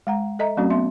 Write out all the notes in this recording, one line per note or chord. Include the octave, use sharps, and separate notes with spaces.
G#3 F#5 A#5
A4 D#5 E5 A#5
F#3 A3 C4 C#4 F#4
B3 E5 C6